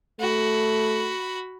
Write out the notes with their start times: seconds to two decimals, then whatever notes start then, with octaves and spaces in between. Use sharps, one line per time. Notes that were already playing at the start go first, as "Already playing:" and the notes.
0.20 A3 F#4 B5